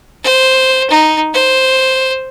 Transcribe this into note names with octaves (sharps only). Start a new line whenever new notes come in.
C5
D#4
C5